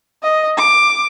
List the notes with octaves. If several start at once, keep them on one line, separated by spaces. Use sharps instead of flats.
D#5
D6